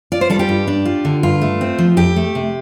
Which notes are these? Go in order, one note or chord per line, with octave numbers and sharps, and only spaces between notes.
F4 D5
C5
G3 A4
G4
G2
D4
F4
D3
G2 F4
A3
C4
F3
F2 G4
A3
C3